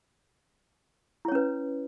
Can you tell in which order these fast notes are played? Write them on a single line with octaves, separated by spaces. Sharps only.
E4 C#5 C#4 B4